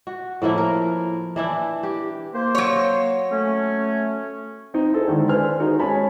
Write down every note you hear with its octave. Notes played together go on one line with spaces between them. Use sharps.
F#4
A2 F3 A#3 E4
A#4
E3 D4 E4
G4
A#3 C5
F#3 C#5
A3 C#4
C4 D#4
E4 G#4 A4 C5
D3 D#3 G#3 E4
A4 B4 C5 D5 G#5 F6
C#4 D#4 F#4 G#4 A#4 C5
G#3 C#4 G#5 A5 B5